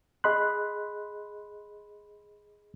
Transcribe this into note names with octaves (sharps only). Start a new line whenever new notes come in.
G#4 D#5 B5 C6 F#6